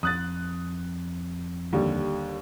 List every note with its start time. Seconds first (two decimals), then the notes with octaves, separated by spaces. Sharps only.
0.03 F2 D#6 F#6 A6
1.73 D#2 D3 G3